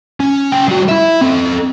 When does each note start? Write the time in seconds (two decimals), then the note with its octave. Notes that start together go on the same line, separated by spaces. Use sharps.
0.20 C#4
0.52 C#4 G5
0.68 G3 F#4
0.88 E4 E5
1.21 C4 A4